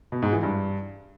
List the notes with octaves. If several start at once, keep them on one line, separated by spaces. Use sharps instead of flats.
B2
G#2
E3
G2